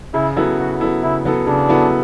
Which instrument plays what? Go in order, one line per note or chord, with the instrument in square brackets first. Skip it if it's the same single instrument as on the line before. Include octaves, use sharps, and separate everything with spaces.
[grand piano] C#3 [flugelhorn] E4
[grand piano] F#3 B3 E4 A4
[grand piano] C#3 [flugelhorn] F#4
[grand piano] F#3 B3 E4 A4
[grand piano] C#3 [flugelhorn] E4
[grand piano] F#3 B3 E4 A4
[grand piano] C#3 [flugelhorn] D4
[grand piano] F#3 B3 E4 A4